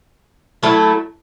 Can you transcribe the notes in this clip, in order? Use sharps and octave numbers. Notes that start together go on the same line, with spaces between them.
F#3 A3 E4 A4